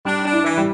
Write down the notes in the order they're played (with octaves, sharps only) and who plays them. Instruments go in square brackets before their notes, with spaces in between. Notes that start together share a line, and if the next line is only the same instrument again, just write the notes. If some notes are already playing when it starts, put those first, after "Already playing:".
[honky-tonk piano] G3 [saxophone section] D4
[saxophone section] D4
[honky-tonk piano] E4
[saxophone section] E3
[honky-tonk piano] G3